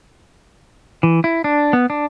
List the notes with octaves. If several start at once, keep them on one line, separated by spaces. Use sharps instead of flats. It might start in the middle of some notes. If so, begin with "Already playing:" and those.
E3
E4
D4
B3
D4